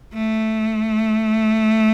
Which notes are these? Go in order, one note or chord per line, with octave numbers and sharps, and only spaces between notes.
A3